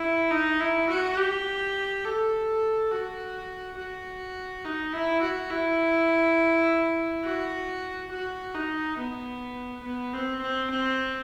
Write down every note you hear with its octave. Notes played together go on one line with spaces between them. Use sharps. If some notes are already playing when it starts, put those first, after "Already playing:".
Already playing: E4
D#4
E4
F#4
G4
A4
F#4
F#4
D#4
E4
F#4
E4
F#4
F#4
D#4
B3
B3
C4
C4
C4